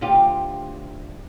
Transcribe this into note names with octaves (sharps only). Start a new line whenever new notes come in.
D2 F4 G4